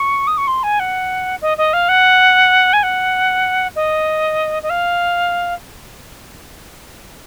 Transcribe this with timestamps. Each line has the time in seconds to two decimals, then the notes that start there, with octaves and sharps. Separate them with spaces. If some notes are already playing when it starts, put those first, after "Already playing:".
Already playing: C#6
0.27 D#6
0.37 C#6
0.47 C6
0.63 G#5
0.79 F#5
1.41 D#5
1.57 D#5
1.73 F5
1.88 F#5
2.73 G#5
2.83 F#5
3.75 D#5
4.63 D#5
4.69 F5